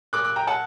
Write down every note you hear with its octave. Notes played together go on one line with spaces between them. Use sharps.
A#2 D6 F#6
D6 F#6
G5 A#5
F#5 A5